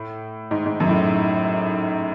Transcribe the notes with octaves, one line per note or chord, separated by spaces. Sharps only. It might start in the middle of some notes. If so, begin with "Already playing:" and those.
Already playing: A2
G#2
G#2
F#2
A2